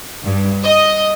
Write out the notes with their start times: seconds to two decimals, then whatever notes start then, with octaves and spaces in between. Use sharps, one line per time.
0.24 G2
0.64 D#5